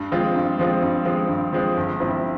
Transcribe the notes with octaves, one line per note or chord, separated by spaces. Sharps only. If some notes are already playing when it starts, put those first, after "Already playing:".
Already playing: G2
F3 G#3 C4 F4
G2
F3 G#3 C4 F4
G2
F3 G#3 C4 F4
G2
F3 G#3 C4 F4
G1
G2 F3 C4 E4